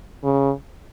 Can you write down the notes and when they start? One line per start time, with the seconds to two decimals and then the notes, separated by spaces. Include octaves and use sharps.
0.24 C#3